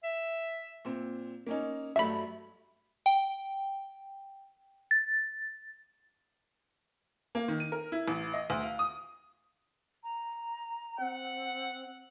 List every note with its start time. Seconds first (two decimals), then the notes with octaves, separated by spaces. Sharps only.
0.04 E5
0.85 A#2 C4
1.47 A#3 C#4 D#4
1.96 G2 F#3 A3 E5 B5
3.06 G5
4.91 A6
7.35 A#3
7.48 D#3
7.60 D#7
7.72 A#4
7.92 E4
8.08 A1
8.34 D#5
8.50 D2
8.63 F5
8.79 D#6
10.03 A#5
10.99 C4 F#5